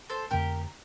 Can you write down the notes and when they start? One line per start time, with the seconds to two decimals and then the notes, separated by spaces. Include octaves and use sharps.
0.10 A4 C5
0.31 F2 D3 A3 C4 G4 A#4